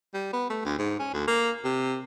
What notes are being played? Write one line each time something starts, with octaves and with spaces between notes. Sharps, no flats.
G3
B3
A3
D2
G#2
C#4
D2
A#3
C3